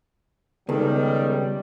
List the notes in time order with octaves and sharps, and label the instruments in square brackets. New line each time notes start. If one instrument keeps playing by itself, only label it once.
[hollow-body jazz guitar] C#2 [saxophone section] D#3 [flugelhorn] G3 [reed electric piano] B3 A4